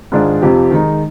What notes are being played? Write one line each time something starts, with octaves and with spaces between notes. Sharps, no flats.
G#2 D#3 G#3 D4 F4
F2 C3 F3 C4 G4
D#3 G#3 D#4